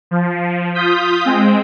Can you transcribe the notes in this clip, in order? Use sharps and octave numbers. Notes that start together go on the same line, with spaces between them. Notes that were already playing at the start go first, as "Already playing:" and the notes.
F3
F4 D#6 G6 B6
G#3 C4